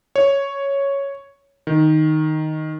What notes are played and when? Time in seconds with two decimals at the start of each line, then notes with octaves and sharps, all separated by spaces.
0.16 C#5
1.67 D#3